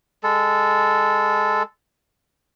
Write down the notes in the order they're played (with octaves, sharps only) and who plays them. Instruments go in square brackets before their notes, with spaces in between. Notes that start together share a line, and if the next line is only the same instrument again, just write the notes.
[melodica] G#3 A4